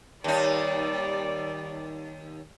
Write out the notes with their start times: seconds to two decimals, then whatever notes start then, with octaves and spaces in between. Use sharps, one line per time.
0.24 D#2 G3 D#4 D5